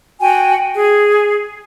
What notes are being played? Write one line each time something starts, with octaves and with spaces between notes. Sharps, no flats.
F#4 G5 G#5
G#4